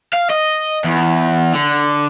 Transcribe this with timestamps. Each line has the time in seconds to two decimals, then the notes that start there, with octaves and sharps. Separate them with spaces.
0.13 F5
0.30 D#5
0.84 E2
1.54 D3